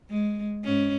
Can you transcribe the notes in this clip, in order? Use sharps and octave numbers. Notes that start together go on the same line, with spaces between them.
G#3
G#2 C#4